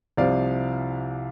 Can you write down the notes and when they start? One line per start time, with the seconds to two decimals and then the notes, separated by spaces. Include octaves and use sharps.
0.17 C2 C3 F3 D5 F5